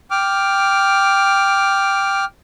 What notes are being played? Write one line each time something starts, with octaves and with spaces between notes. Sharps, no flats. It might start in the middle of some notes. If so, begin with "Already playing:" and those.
G5 D6 F6